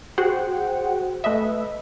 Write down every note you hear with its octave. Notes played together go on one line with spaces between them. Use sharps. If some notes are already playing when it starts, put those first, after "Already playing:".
F#4 G#4 C5 F#5 G5
A3 B4 D#5 E5